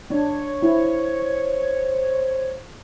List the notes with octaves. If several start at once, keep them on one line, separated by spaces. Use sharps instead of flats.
D4 C#5
E4 C5